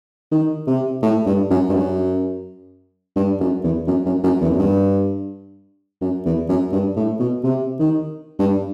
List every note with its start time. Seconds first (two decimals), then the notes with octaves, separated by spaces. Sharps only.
0.31 D#3
0.67 C3
1.02 A2
1.26 G2
1.50 F#2
1.69 G2
1.74 F#2
3.16 G2
3.40 F#2
3.64 E2
3.87 F#2
4.06 F#2
4.23 F#2
4.41 E2
4.50 F#2
4.59 G2
6.01 F#2
6.25 E2
6.48 F#2
6.72 G2
6.96 A2
7.20 B2
7.44 C3
7.79 D#3
8.39 G2